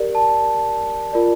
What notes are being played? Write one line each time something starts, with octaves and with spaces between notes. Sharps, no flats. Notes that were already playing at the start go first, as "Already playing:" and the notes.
Already playing: G4 A#4 D5
A5
F4 A#4 D5